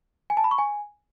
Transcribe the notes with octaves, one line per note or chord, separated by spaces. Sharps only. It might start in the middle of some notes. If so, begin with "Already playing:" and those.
G#5
A5
B5
C#6
G#5